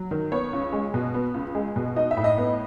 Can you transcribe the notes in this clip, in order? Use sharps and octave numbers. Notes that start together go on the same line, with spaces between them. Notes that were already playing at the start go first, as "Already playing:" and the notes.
Already playing: F#3
D#3
B3 C#5
C#2
G#3
B2
B3
C#2
G#3
B2
D#4 D#5
E5
A2
D#5
B3